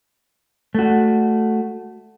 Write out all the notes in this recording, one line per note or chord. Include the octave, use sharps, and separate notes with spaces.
A3 F#4